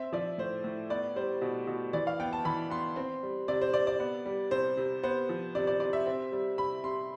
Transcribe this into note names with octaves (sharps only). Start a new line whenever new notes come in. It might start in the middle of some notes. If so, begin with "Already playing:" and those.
Already playing: C4 E5
F3 D5
A2 C5
A2
B3 D5
G3 C5
B2
B2
E3 D5
F5
B3 G5
A5
E3 B5
B3 C6
C4
G3
C3 D5
C5
C3 D5
D5
B3
G3
C3 C5
C3
B3 C5
F3
C3 D5
D5
C3 D5
E5
C4
G3
C3 B5
C3 C6